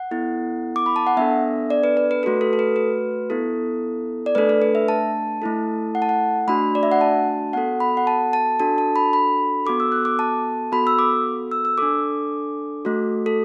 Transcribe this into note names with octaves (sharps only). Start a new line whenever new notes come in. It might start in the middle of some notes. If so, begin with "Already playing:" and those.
Already playing: F#5
B3 E4 A4
D6
B5
A5
F#5
B3 D4 A4 E5
D5
B4
B4
B4
A3 F#4 A4 B4
A4
A4
B4
B4
B3 E4 A4
D5
A3 D4 A4 B4
A4
B4
E5
A5
A3 E4 A4
F#5
A5
F#5
A3 D4 F#4 B5
D5
E5
F#5
A5
B3 F#4 A4 F#5
B5
F#5
A5
A5
D4 F#4 A4 A5
A5
B5
B5
B3 F#4 A4 D6
E6
F#6
D6
A5
B3 F#4 A4 B5
E6
D6
E6
E6
D4 A4 D6
A3 F#4 A4
A4